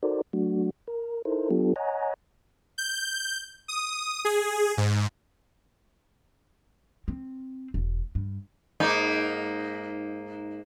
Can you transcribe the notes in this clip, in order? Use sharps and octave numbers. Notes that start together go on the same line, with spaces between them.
D#4 F#4 A4 A#4 C5 D5
F#3 A3 D4 F#4
A#4
D#4 E4 A4 A#4 C5
F#3 B3 D4 F4 G4 A4
C#5 D#5 F#5 G#5 A#5
G6
D#6
G#4
G#2
C4
E1
G2
G#2 A#3 D#4